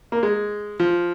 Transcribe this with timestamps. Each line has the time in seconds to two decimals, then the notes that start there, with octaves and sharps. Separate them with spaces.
0.12 A#3
0.23 G#3
0.80 F3